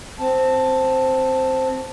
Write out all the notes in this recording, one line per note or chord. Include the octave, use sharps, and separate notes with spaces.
C4 A5